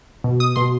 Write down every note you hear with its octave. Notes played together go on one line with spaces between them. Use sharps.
B2
D#6
B2 C6